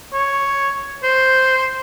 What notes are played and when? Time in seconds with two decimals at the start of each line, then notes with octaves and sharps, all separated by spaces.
0.13 C#5
1.04 C5